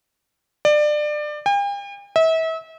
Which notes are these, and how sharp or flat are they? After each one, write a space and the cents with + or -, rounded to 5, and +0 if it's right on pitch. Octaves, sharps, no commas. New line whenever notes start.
D5 +25
G5 +45
E5 -35